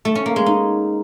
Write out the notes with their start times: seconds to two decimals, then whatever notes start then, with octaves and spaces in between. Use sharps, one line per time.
0.05 A3
0.15 C#4
0.26 A#3
0.36 G#3
0.46 D#4